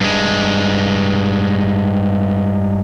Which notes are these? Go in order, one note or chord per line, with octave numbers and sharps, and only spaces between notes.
G2 G#3